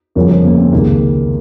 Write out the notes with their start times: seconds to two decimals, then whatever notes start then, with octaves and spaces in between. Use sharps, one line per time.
0.15 G1 F2 C#3 F3 G#3 A#4 C#5
0.30 G#4 C5
0.44 A#3 C#4
0.58 C4
0.72 C#2 C3 D#3 A#3